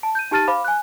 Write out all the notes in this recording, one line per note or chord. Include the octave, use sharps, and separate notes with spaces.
A5
G6 D#7
D#4 G4 A5 F6 A6 D#7
C5 F5 B5 D6
G#5 F#6